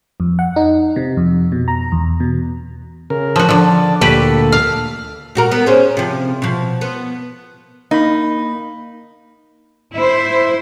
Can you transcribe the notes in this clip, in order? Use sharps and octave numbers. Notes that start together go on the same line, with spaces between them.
F2
F#5
D#4
C3
F2
B2
A#5
E2
B2
C#3 A#4
F3 F#4
D3 F3 D5
D2 A#2 F#4 G4 A4 B4
F5
A#2 F#4 A#4
B3
C#4 G#4 C5
C3 F3
B2 F3
B3
A#3 D#4 B5
E4 C5